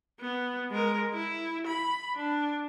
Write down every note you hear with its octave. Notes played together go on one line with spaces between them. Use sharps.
B3
G#3 A#4
E4
B5
D4